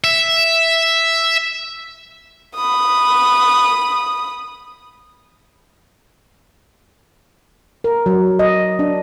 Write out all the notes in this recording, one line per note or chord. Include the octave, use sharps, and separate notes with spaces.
E5
B5 D#6
A#4
F#3
D#5
D4